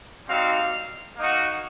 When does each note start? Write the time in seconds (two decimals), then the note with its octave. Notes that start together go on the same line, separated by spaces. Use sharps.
0.28 G3 C4 D#4 F#4 F5
1.16 A#3 D#4 F#4